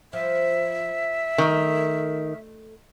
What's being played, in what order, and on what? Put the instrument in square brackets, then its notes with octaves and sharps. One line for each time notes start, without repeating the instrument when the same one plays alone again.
[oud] F3 [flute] E5
[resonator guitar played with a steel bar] D#3 [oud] A3 A#4